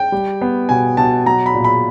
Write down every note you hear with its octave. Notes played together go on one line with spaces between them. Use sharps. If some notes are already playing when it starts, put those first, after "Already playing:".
Already playing: G5
G3
B3
B2 G#5
B2 A5
F#3 A#5
B5
A#2
B5